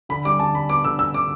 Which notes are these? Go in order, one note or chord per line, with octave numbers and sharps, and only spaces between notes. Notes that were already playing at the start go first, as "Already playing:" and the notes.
D3 B5
G3 D6
D3 A5
G3 B5
B3 D6
D3 E6
D3 E6
D3 D6